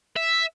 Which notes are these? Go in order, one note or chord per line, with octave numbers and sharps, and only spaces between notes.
E5